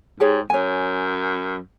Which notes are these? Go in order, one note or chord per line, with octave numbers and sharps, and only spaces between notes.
G#2 G4 G#4 C#5
F#2 C#5 G#5